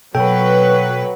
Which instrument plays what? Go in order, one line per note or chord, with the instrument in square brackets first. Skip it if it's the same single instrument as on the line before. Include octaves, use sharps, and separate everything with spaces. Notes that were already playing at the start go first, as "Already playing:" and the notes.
[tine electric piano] B2 A4 G5 [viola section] F#3 B4